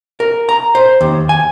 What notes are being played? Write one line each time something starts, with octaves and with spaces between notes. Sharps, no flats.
A#4
A#5
C5
D#2
G#5